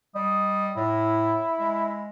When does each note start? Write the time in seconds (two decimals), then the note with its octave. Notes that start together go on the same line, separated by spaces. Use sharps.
0.15 G3 D#5
0.76 A2 E4
1.60 G#3